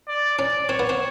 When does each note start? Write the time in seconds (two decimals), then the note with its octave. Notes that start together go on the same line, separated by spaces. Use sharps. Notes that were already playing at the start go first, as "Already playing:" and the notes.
0.08 D5
0.39 C#4 D5
0.69 C4 C#5
0.79 B3
0.89 C4